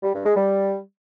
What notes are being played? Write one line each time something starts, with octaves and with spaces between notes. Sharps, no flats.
G3
G2
G#3
G3